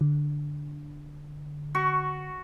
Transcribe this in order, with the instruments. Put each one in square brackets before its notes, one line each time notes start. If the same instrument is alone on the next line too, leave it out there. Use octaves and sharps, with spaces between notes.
[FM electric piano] D3
[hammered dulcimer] F#4 C#6